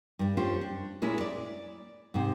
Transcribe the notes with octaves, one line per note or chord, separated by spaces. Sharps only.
G2 G3
C#4 D4 F4 G4 C5
D4
A#2 G#3 C#4 E4
D5
G#2 C3